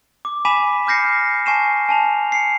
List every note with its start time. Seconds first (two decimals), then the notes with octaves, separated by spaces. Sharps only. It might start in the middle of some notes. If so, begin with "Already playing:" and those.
0.25 D6
0.45 G#5 B5 D6 B6 D#7 E7
0.87 D6 F6 G6 A#6 C7 C#7
1.46 G#5 A5 C#6 C7 D#7 E7
1.89 G#5 A5 F7
2.32 C7 C#7